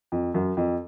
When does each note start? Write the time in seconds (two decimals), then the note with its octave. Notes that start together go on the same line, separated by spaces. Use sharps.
0.12 F2
0.34 F#2
0.57 F2